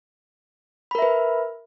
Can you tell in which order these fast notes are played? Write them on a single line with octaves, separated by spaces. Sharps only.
B5 A#4 E5 B4